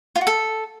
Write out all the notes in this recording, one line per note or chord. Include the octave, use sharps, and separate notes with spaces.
F4
F#4
A4